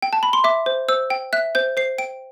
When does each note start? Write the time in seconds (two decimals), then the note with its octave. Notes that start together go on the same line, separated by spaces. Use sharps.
0.02 G5
0.13 A5
0.23 B5
0.33 C6
0.44 E5 D6
0.66 C5
0.88 C5 E6
1.10 G5
1.33 E5 F#6
1.55 C5 G6
1.77 C5 C7
1.98 G5 D7